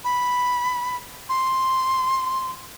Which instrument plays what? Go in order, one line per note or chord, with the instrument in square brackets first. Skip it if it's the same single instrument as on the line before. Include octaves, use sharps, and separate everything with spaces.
[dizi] B5
C6